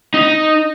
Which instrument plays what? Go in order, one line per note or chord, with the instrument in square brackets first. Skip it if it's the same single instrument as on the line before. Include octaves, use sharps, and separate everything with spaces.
[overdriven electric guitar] D#4